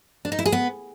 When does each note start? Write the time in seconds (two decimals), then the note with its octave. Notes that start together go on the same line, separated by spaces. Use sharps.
0.25 D4
0.32 D#4
0.39 E4
0.46 G#4
0.52 B3